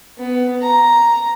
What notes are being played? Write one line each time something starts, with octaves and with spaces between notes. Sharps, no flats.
B3
A#5